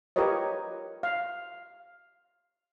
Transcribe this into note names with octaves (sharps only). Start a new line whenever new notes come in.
F4 G4 A#4 B4 C#5 D#5
F5